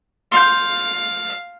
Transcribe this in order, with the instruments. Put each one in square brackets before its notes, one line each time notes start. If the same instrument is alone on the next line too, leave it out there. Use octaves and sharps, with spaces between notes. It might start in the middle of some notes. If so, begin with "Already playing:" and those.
[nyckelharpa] F5 [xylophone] C6 G6